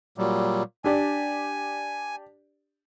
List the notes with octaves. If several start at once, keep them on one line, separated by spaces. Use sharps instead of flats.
A#2 F#3 G3
D4 G4 D5 G#5